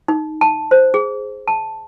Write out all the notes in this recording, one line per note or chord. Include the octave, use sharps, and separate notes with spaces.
D#4
A5
C5
G#4
A5